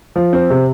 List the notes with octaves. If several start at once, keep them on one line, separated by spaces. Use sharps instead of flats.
F3
C4
C3